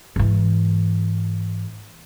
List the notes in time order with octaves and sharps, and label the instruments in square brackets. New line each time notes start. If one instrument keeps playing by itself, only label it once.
[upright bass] G#2 E3